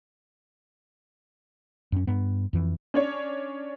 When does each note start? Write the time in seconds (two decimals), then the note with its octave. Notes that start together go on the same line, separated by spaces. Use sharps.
1.92 F#2 C#4
2.07 G2 B3
2.53 F2 E3
2.94 C#4 D4 C#5